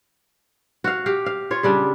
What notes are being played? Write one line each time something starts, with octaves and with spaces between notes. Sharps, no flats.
F#4 F5
G4 F5
F5
F4 C#5
C#3 G3 D4